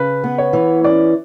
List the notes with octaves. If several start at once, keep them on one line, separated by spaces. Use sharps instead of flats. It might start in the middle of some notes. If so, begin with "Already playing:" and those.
Already playing: C#3 B4
B3
C#5
E3
C#4 D5